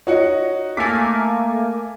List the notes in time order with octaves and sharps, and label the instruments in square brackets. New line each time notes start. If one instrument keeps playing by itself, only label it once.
[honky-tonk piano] D#4 F#4 C#7 [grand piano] C#5 D#5
[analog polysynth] A3 A#3 [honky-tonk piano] G#5 D6 [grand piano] B6